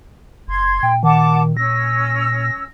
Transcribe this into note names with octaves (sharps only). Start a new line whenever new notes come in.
F#1 C6 G#6
A#2 G5
D#3 F#5 A5 D6
C#4 E6 A#6